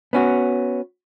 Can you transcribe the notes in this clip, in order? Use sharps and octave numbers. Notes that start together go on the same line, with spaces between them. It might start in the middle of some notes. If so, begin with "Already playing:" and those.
B3 C#4 F#4